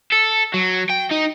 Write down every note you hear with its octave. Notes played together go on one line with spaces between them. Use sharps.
A4
F#3
G5
D#4